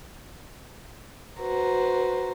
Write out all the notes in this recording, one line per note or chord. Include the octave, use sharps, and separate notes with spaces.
F#4 B4 C5 A#5